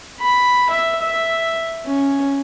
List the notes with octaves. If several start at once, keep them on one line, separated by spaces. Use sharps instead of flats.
B5
E5
E5
C#4